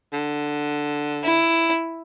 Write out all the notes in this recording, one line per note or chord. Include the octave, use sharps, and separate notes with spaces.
D3
E4